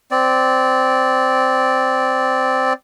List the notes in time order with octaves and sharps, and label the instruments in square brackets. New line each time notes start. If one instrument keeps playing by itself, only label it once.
[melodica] C4 D5